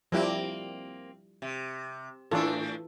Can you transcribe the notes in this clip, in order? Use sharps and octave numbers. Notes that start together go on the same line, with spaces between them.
F3 G3 A#3 C4 E4
C3
A2 E3 D4 F4 A4